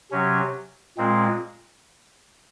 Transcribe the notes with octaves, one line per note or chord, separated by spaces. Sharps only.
C3 F#3 C#4
A#2 G#3 C4